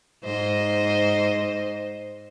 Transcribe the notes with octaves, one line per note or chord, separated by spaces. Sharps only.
G#2 C5 D#5